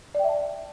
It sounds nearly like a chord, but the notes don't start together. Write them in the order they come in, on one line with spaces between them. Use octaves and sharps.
D5 G5 E5 A5